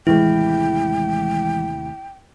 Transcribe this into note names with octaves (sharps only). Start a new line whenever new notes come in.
D#2 A2 C3 E3 G#3 E4 G5